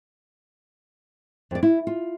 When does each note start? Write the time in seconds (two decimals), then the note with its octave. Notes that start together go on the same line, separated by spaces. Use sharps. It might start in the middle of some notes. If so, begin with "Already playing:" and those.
1.51 F2 D5
1.63 E4
1.87 F4